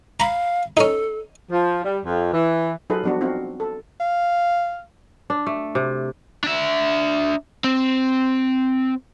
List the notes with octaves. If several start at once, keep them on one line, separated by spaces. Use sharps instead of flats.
F5 A#5 B5
C#4 D#4 A4
F3
G3
F2
E3
F#3 D#4 F4 G#4 A4 B4
F3 G3 B3 D4 F#4
C4 D#4 F4 F#4
A4
F5
D4
A3
C3
D4 E5
C4